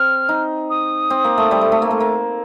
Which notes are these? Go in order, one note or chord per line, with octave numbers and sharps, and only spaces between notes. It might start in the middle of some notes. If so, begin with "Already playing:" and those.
Already playing: C4 F6
D#4
D#6
C4
A#3
A3
G3
A3
A3
A#3
A3
A#3